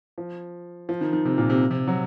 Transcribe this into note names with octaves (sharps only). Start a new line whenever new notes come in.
F3
F3
D#3
D#3
C3
A#2
C3
C3
F#3